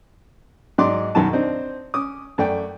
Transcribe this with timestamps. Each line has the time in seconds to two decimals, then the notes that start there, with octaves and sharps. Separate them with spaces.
0.78 G#2 F#3 D5 C6 D6
1.15 B1 F#2 D#3 F#3 A5
1.33 C4 D4 D#4 C5
1.94 C#4 D6 D#6
2.38 F#2 A3 D5 G5